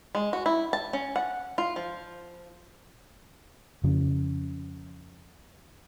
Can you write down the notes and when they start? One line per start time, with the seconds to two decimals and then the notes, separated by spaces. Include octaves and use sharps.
0.15 G#3
0.33 F#4
0.46 E4
0.73 A5
0.93 C#4
1.16 F#5
1.58 F4
1.76 F3
3.84 F2 C#3 F3